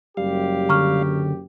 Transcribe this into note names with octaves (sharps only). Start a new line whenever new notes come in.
F#1 F#2 G3 G4 F5
D3 A#5 C#6 F6